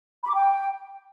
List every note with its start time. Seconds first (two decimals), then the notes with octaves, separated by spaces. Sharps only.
0.23 B5
0.28 D6
0.33 G5